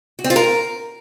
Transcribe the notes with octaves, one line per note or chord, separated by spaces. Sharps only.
F#4
C4
F4
A#4